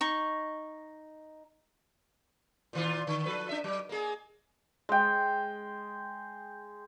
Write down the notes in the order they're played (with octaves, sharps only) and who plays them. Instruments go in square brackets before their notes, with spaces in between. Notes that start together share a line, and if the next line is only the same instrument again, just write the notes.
[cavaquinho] D#4 C#6
[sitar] A#2 D#3 F4
D3
F3 A4 B4
D4 E5
F#3
A#3 G#4
[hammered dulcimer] G#3 G5